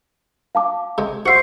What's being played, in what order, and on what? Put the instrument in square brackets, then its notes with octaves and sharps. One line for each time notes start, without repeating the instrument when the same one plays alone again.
[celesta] F5 A5 D6
[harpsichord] C3 G#3
[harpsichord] F#4 E5 [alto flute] C5 [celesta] C6 C7 C#7